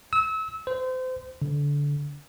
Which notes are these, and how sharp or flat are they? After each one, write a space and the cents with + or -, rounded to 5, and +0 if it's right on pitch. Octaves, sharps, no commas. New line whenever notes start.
E6 -30
C5 -30
D3 -25